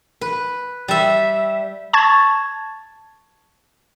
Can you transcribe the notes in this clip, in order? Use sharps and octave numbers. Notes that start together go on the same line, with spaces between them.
B4
G3 E5
A5 C#6 G#6 A6